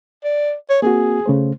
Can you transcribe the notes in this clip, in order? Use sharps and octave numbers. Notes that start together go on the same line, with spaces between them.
D5
C#5
A#3 C4 F#4 G#4
C#3 A3 C5